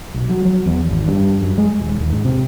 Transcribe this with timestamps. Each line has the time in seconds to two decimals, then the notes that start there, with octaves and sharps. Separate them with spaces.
0.14 B1
0.30 F#3
0.45 F#3
0.66 E2
0.89 G#1
1.08 G2
1.42 F#2
1.58 G#3
1.79 D#1
2.00 D#2
2.13 G#2
2.25 C3